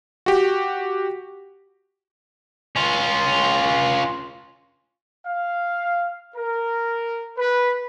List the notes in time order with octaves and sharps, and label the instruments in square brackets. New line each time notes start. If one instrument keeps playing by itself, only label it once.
[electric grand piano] F#4 G4
[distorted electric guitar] C#4 F4
[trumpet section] F5
A#4
B4